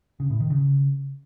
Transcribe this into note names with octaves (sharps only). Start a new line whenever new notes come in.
C#3
A2
D#3
C#3